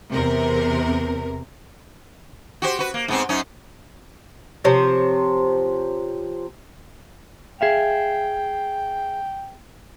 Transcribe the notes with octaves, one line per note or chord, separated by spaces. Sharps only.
E2 C3 A#4
F#4 G4 C5
F#4 B4
A#3
G#2 B3 C4
F#2 C#4 D#4
C3 F3 C5 C#5
G#4 E5 F5 G5